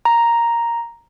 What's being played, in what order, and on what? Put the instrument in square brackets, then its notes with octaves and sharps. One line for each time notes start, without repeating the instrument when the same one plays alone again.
[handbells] A#5